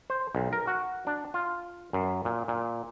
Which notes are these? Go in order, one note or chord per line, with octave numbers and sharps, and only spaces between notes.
C5
B1
A#4
F#4
D4
F4
F#2
A#2
A#2